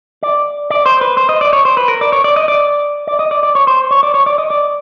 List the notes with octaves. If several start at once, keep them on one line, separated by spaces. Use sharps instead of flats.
D5
D5
C5
B4
C5
D#5
D5
C#5
C5
B4
A#4
D5
C#5
D5
D#5
D5
D5
D#5
D5
D5
C#5
C5
C#5
D5
C#5
D5
D#5
D5